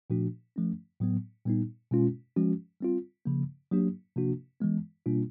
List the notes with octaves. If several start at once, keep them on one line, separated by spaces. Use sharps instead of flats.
A#2 F3 A3 D4 F#4
F3 A3 C#4
A2 F#3 B3
A#2 G3 B3 D#4
B2 G#3 C#4 F4
F3 G#3 C#4 F#4
G3 C4 F4
C#3 F3 A#3
F#3 A#3 D4 G4
C3 F3 A#3 D4 F#4
E3 G#3 B3
B2 G3 A#3 D4 F4